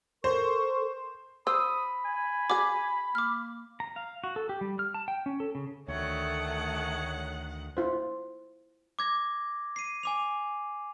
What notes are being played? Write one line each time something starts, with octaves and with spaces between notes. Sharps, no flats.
A4 A#4 C5 C#6
C5 B5 D#6 E6
G#5
F#4 G#4 D6
A#3 D6 F6
A#5
F5
F#4
A4
G4
G3
F6
A5
G5
C#4
A4
C#3
D2 D#3 A3 C#5 F#5
E4 F4 C5
D6 G#6 A#6
C7 D#7
G#5 D6 F7